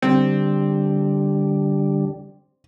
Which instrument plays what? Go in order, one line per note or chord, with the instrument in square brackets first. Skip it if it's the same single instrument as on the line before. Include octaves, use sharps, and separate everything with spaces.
[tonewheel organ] D3 G3 [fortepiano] C4